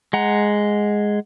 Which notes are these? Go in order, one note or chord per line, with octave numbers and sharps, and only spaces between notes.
G#3 F#5 A#5